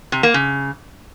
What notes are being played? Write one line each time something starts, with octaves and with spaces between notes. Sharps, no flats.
C3
A#3
C#3